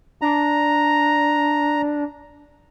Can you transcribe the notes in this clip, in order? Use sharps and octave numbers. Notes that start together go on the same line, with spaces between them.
D4 A#5